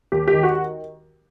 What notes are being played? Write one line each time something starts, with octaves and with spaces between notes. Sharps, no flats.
D#2 G4
G4
D#3
F#4